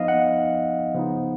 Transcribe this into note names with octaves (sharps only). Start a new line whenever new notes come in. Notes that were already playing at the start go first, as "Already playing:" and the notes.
Already playing: F3 B3 D#4 D#5 F5
F#5
C#3 F3 B3 D#4